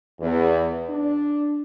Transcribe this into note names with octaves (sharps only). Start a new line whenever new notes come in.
E2
D4